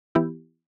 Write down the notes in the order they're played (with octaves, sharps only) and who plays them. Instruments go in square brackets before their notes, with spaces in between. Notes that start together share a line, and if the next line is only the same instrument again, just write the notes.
[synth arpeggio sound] E3 B3 E4 G4